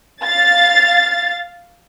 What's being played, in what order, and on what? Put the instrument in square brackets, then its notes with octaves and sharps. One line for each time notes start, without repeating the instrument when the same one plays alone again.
[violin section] F5 A6